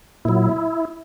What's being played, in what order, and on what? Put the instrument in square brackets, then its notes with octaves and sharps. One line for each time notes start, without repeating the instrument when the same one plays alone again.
[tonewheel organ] A#2 F#3 E4